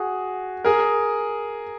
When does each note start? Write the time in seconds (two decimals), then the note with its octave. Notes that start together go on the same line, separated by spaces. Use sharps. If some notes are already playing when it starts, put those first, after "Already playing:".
Already playing: F#4 G#4
0.65 G#4 A#4